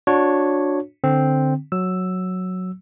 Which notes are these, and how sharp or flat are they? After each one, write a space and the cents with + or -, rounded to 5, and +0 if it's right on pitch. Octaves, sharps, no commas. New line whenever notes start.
D4 +0 F#4 -30 C#5 -5
D3 +5 C4 +0
F#3 -5 E6 +0